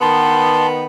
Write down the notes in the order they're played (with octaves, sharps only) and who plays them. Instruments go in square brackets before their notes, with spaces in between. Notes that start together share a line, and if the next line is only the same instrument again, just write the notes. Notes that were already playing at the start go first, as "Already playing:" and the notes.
[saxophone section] D#3 B3 [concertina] A5 C6